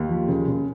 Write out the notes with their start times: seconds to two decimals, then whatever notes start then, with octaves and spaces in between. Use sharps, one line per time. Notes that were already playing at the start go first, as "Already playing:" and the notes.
Already playing: D#2
0.09 F3
0.28 C#3
0.48 C#3